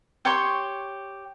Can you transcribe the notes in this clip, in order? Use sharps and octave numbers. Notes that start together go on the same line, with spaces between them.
G4 C#5 C6 C#6